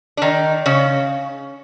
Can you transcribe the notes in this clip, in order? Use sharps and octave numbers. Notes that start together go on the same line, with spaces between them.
D4
D#3 D#4
C#3 C#4